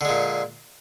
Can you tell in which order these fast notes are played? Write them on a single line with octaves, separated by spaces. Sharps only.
D3 G#3 A#2